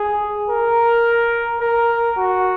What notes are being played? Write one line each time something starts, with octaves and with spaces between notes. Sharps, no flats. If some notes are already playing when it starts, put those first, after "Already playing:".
Already playing: G#4
A#4
A#4
F#4